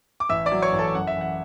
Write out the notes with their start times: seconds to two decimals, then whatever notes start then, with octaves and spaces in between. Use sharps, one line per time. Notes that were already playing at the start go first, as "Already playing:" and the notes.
0.20 D6
0.29 A1 E5 E6
0.46 D5 D6
0.52 F#3
0.62 C#5 C#6
0.73 A1
0.79 A4 A5
0.95 F#2 F#5
1.07 E5
1.16 E3 F#5